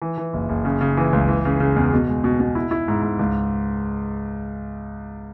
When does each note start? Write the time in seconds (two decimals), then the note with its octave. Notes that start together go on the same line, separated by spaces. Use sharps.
0.02 E3
0.18 E3
0.33 F#1
0.49 F#1
0.65 C#3
0.81 C#3
0.97 E3
1.13 C#2
1.29 E3
1.45 C#3
1.60 C#3
1.76 E2
1.93 B2
2.08 G#3
2.24 B2
2.40 B2
2.55 E4
2.71 E4
2.88 G#2
3.03 G#2
3.19 C#2